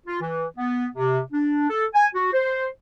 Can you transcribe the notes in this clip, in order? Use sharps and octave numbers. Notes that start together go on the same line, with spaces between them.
F4
E3
B3
C3
D4
A4
G#5
F#4
C5